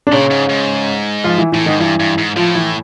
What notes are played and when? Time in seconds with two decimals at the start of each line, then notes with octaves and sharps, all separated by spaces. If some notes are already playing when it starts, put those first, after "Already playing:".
0.07 D4
0.12 A#2 C#3 C#4
0.31 G#2
0.49 G#2
1.24 F3 F4
1.38 E3 E4
1.52 A2 E3 E4
1.66 G#2 D#3 D#4
1.80 G2 E3 E4
2.00 G2
2.18 G#2
2.36 A2 F3 F4
2.55 E3 E4